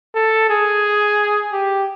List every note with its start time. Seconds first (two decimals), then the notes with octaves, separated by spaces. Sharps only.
0.15 A4
0.50 G#4
1.53 G4